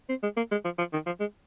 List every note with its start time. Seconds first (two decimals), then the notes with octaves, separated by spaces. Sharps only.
0.09 C4
0.23 G#3
0.37 A#3
0.51 G#3
0.64 F3
0.78 F3
0.93 D#3
1.06 F3
1.20 G#3